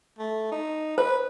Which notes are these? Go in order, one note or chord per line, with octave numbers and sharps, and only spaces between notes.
A3
D#4
B4 C5